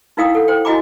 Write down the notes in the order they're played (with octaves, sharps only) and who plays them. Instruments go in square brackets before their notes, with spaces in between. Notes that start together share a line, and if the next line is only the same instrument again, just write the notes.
[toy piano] D#4 E4 A#4 F5 G5 D#6
A4 F#5
C5 G5
E4 F#4 D#5 G#5 A#5 D6